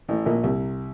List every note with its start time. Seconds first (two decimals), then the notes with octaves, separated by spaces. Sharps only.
0.08 A1 A2
0.26 A#1 A#2
0.43 C2 C3